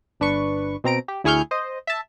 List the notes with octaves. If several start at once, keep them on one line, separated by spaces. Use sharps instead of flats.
G1 D4 B4 C#6
B2 C4 A#5 D7
G4
D2 E4 G#4 C#6 F6 G6
C5 D#5
E5 A5